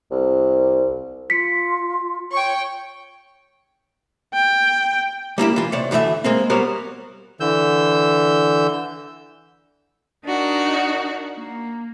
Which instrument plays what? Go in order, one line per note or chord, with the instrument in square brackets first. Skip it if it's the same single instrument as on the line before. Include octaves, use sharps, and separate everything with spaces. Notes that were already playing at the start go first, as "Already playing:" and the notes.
[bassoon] C2
[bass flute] F4 [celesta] B6 C#7
[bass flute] C#5 [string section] G5 C#6
[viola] G5
[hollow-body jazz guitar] G3 A#3 E4 G4
E3 F4
C3 C#5 D5
D2 E3 A3 D5 E5
G#3 A#3 C4
G3 B3 F#4 A#4 C5 C#5
[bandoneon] D3 E3 E6 G6
[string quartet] D4 D#4 F#4 A#4
A#3